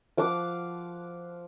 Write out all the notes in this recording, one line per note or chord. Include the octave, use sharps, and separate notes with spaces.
F3 F5 F#5 D6